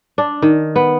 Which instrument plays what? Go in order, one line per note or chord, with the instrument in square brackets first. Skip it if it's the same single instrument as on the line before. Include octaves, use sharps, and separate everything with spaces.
[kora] D4
D#3
B3